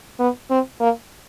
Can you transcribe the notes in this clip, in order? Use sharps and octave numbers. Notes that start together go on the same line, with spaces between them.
B3
C4
A#3